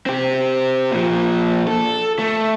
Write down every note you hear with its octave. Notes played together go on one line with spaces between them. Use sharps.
C4 G4
A#2 F3
A4
A3